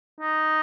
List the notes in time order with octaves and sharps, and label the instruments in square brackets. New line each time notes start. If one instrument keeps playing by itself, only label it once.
[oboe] D#4